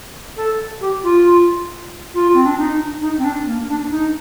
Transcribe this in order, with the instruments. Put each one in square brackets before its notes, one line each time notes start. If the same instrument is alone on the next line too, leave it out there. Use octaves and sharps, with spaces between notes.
[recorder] A4
G4
F4
F4
C4
D4
D#4
D#4
C4
D4
A#3
D4
D#4